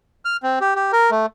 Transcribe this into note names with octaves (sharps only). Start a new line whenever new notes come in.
F6
C4
G4
G4
A#4
A3